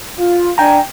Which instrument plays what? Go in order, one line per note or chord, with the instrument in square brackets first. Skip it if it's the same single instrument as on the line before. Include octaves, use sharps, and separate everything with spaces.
[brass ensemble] F4
[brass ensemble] D4 G#5 [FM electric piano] G5 A#5